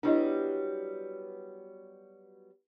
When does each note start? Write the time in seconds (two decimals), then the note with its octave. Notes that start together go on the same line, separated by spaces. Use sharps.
0.03 F#3 G3 B3 D4 E4 D#5